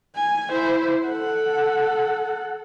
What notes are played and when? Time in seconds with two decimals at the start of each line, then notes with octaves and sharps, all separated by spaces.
0.17 G#5
0.51 E4 C5
1.07 A4 F#5